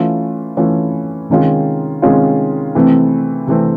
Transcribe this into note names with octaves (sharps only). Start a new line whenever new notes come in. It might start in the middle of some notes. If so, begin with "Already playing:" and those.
Already playing: E3 A3 C#4 F4
E3 A3 C#4 F4
C3 D#3 G#3 C#4 F4
C3 D#3 G#3 C#4 F4
C3 E3 A3 C4
C3 E3 A3 C4